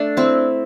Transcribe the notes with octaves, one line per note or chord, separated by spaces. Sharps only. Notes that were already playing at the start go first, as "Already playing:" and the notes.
Already playing: A3 D4
C4 E4